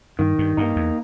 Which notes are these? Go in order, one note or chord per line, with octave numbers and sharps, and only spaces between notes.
G2 D#3
G2
G2 A#3 D#4
E2